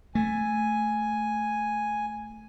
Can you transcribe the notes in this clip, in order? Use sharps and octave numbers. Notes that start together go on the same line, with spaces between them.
A3 G#5